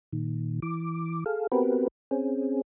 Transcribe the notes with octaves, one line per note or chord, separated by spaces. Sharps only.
A#2 D#3
E3 D6
G#4 A4 F5
B3 C4 F#4 G4 A#4 B4
C4 C#4 G#4